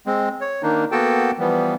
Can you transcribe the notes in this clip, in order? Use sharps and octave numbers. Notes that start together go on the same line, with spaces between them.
G#3 C4
C#5
D#3 A#3 D4 D#4
A#3 B3 F#4 A4 G5 A5
E3 F3 G3 B3